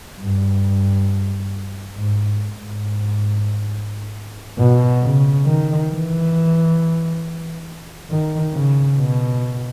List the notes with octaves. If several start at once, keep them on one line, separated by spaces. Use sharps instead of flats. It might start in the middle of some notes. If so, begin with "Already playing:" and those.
G2
G#2
G#2
B2
C#3
D#3
E3
D#3
C#3
B2